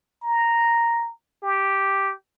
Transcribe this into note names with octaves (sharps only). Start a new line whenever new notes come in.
A#5
G4